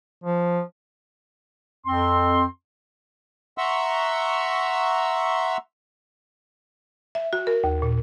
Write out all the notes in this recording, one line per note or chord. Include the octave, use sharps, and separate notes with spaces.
F3
F2 C4 C6
E5 F#5 A#5 C6 C#6 E6
E5
F#4
A#4
D#2
A#2